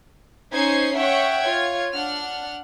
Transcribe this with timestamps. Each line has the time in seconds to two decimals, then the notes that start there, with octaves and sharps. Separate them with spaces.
0.52 C#4 D#4 C5 C#6 G#6 C7
0.95 C#5 E5 F#5 G5 C#6
1.41 F4 C#5 G#6
1.93 D4 F#5 F6